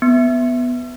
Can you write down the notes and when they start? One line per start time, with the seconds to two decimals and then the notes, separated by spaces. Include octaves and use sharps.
0.02 B3